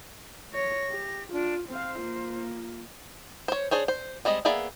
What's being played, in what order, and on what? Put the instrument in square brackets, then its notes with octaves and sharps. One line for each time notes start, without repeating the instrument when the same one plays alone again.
[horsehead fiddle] C#5 [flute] A#6
[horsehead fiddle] G4
[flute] D4 [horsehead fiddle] F4
[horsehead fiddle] C4 F5 [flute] C5
[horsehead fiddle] A#3 F4
[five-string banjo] C5 C#5
D4 G#4 C5 C#5
C5
G3 G#3 C4 D#5
A#3 B3 G#4 D5 E5